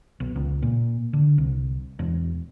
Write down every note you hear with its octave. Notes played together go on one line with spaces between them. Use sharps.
B1
C#2
A#2
D3
C2
E1